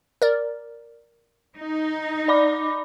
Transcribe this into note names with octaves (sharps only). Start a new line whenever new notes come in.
A#4 D5
D#4
D5 B5 D6